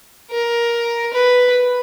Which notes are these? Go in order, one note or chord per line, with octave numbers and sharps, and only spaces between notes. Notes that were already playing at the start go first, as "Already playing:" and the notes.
A#4
B4